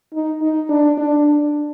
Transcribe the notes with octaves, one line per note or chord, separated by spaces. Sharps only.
D#4
D#4
D4
D4